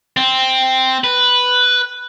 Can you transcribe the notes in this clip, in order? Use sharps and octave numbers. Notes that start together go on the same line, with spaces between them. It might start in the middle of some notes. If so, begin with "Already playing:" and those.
C4
B4